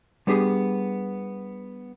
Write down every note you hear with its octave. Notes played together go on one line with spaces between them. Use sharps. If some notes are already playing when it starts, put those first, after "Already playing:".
G3 B3 D4 G4 G#4